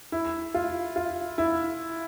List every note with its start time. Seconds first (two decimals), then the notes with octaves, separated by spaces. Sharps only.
0.12 E4
0.54 F4
0.96 F4
1.38 E4